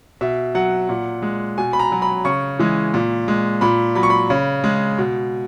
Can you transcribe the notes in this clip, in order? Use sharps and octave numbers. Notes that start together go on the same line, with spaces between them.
B2 E5
F#3 F#5
A#2
G#3
B2 G#5
B5
A#5
F#3
B5
C#3 C#6
E3 G#3
A#2
G#3
A#2 B5
F#3 B5
C#6
B5
C#3
G#3
B2